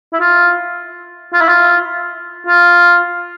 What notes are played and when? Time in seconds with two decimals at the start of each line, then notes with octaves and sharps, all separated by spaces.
0.13 E4
0.20 F4
1.33 F4
1.41 E4
1.48 F4
2.46 F4